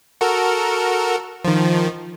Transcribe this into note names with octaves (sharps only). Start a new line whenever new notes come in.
F#4 A4 A#4
D#3 F3